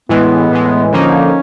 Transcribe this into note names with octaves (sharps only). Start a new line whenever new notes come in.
A2 E3 G#3 B3
A2 E3 G#3
D3 F3 A#3 C#4 D#4